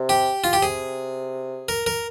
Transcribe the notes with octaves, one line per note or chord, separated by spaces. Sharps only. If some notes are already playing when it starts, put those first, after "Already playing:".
Already playing: C3
G4
F4
G4
C3 G#4
A#4
A#4